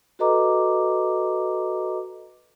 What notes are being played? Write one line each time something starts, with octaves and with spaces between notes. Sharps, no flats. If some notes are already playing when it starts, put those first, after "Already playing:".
F#4 A4 B4 D#5 A#5 D6